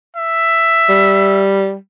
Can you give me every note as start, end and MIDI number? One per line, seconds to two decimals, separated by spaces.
0.17 1.43 76
0.89 1.76 55